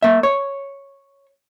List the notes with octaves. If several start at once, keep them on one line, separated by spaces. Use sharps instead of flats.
A#3 E5
C#5